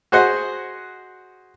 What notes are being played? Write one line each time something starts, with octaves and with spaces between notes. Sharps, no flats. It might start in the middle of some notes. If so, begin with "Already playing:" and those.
F#4 G#4 C5 D#5 F#5